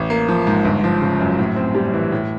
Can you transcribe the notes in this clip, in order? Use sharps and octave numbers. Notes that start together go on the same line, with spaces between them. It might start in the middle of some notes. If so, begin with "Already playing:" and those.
Already playing: A1
A#3
F3
G#2
G1
F3
C#3
F#2
A2
C4
G3
E3
A2